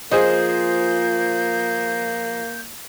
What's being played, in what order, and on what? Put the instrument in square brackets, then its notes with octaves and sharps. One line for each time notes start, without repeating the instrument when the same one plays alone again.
[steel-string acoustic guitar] F3 [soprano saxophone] A#3 [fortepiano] G#4 C5 D#5 [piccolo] G6